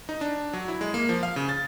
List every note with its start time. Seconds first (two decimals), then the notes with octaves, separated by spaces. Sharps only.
0.09 D#4
0.21 D4
0.53 F#3
0.68 E4
0.81 G#3
0.94 A#3
1.09 F3
1.23 F5
1.36 C#3
1.49 A6